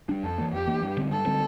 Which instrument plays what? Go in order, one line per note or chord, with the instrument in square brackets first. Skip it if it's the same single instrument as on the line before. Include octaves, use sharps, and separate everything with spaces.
[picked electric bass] G3 D4
[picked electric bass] F2 [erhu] A4
[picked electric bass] E3 A#3
[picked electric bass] F2 [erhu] G4
[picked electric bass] E3 A#3
G2
D3 G3 C4
[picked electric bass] G2 [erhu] A4
[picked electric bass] D3 G3 C4